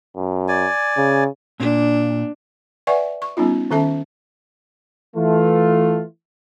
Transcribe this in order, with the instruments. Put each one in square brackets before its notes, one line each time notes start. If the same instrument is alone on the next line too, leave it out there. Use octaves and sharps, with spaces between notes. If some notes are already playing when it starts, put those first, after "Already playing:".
[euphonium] F#2
[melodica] D5 G#5
[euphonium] C#3
[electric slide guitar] A#2 [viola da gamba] D4
[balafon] B4 D5 E5 F#5 G#5 C#6
C#6
G3 B3 C#4 D#4 F4
D#3 C#4 A4 E5 A5
[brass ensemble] E3 A3 F4